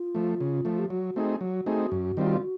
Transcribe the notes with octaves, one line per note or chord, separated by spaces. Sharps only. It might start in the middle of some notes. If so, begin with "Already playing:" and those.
Already playing: F4
F3 A3
C#3
F3 A3
G4
F#3 F#4
A3 C4 D#4 G#4
F#3 F#4
A3 C4 D#4 G#4
F#2
D#3 G3 C4 F4